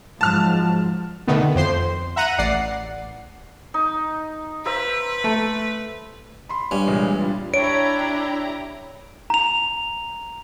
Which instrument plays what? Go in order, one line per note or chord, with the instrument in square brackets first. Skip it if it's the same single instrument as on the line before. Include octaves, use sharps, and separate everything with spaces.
[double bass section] G#2 F3 F#3 [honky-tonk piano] A5 F6
[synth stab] B2 D3 D#3 A3 B3
F2 C5 C6
E5 F#5 A#5 F#6 D#7
A1 D5 F#5 C7
[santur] D#4
[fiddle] B4 [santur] C5 E5 A#5
[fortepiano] A3
[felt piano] B5 C6
[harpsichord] G2 C#4
[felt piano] A#2 E3 G#3
G3 D4 F4
[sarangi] D4 [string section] E4 G4 A#5 [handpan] C#5 [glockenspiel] D7
[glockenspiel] A#5 F7